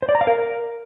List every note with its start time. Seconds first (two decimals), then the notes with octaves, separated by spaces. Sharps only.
0.02 C5
0.09 D5
0.15 A#5
0.21 F5
0.27 A#4